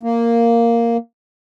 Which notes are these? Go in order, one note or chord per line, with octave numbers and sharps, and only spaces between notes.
A#3